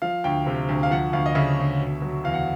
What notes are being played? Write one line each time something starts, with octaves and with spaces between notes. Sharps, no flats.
F3 F5
D2 G5
C3
D2
F5
F3 F#5
D2 F5
D#5
C#3 E5
D2
B2
F#3
E2 F5
F#5